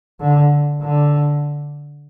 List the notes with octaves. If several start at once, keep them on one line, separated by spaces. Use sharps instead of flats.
D3
D3